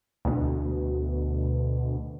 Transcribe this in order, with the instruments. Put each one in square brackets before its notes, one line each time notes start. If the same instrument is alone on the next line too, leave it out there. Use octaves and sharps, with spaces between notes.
[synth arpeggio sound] D2 B2